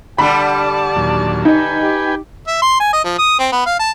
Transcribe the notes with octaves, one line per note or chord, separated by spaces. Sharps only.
D3 G3 D5 A5 B5
D#2 A#2 F#3
D#4 B4 G5 G#5
G4
E5
C6
G#5
D#5
F3
D#6
C4
B3
F5
A5